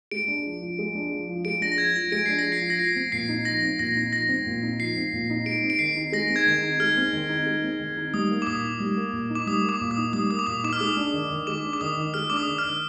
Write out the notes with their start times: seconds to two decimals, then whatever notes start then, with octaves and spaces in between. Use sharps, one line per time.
0.11 G#3 D7
0.28 D4
0.46 F3
0.62 F3
0.79 G#3
0.95 D4
1.12 F3
1.29 F3
1.45 G#3 D7
1.61 D4 A#6
1.72 A#6
1.78 F3 G#6
1.96 F3 A#6
2.12 G#3 D7
2.26 D4 C7
2.38 A#6
2.45 F3
2.52 C7
2.62 F3
2.70 A#6
2.79 F3 C7
2.96 C4
3.12 A#2 C7
3.29 D#4
3.45 F3 A#6
3.63 C4
3.79 A#2 A#6
3.96 D#4
4.12 F3 A#6
4.29 C4
4.46 A#2
4.63 D#4
4.79 F3 C7
4.96 C4
5.13 A#2
5.30 D#4
5.46 G#3 D7
5.63 C4
5.70 D7
5.79 D#3 C7
5.96 D#4
6.12 G#3 A#6
6.29 C4
6.36 G#6
6.47 D#3
6.62 D#4
6.80 G#3 F6
6.97 C4
7.13 D#3
7.29 D#4
7.46 G#3
7.63 C4
7.80 D#3
7.97 D#4
8.13 G3 D#6
8.31 A#3
8.42 D6
8.47 A#2 D#6
8.64 D#4
8.80 G3
8.97 A#3
9.13 A#2
9.30 D#4
9.35 D6
9.47 G3 D#6
9.64 A#3
9.69 D6
9.81 A#2
9.91 D#6
9.97 D#4
10.13 G3 D#6
10.31 A#3 D#6
10.39 D6
10.47 A#2 D#6
10.64 D#4 D6
10.73 F6
10.80 G#3 D#6
10.97 D4
11.14 D#3
11.31 D#3
11.47 G#3 D6
11.64 D4
11.73 D6
11.81 D#3 D#6
11.97 D#3
12.14 G#3 F6
12.30 D4 D6
12.37 D#6
12.48 D#3
12.58 F6
12.65 D#3